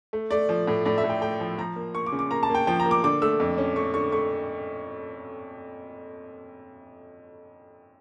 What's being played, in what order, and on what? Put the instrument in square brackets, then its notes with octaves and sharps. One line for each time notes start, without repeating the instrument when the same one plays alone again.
[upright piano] A3
A3 D5
F3
A2
A2 D5
E5
A2
G5
A3 G5
F3
F3 A#5
A#3
A#3 C#6
D6
C#3
D6
A#3 A#5
A5
A#3 G5
F3 G5
A#5
A#3
D6
D3 D6
A3 E6
F2
C#4
A3 C#6
D3 C#6
A3 C#6